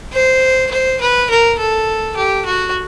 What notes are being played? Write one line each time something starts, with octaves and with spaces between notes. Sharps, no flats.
C5
C5
B4
A#4
A4
G4
F#4